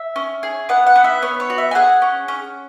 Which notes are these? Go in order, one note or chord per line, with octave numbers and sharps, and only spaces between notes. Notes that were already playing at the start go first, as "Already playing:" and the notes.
Already playing: E5
C#4
G#4
B3 F#5
F#5
B3
E5
B3 C#5
C#5
F#4
E5
G#5
G#4 F#5
C#4
C#4